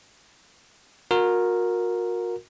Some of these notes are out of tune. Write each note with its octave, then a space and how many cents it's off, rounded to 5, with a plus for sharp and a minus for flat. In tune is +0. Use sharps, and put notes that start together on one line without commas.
F#4 -35 A#4 +0